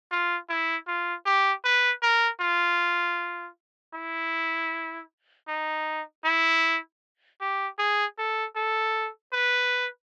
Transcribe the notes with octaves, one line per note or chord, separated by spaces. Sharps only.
F4
E4
F4
G4
B4
A#4
F4
E4
D#4
E4
G4
G#4
A4
A4
B4